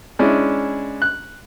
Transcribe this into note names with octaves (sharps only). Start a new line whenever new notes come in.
G#3 C#4 D4 E4
F#6